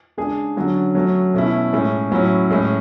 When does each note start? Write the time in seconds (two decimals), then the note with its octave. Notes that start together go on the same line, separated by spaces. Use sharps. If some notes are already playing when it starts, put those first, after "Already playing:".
0.17 C#3 G#3 D4 G#4
0.57 D3 F#3 C#4
0.95 F#3 A3 C#4
1.34 B2 A3 C#4 E4
1.73 A2 G#3 C#4
2.11 A2 F#3 C#4 E4
2.50 A2 G#3 C#4